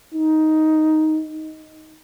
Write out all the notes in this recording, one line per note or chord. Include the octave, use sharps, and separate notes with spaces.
D#4